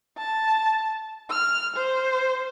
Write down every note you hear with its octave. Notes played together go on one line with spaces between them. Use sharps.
A5
F6
C5